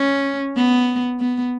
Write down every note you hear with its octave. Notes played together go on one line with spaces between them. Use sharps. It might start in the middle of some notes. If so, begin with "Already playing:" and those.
Already playing: C#4
B3
B3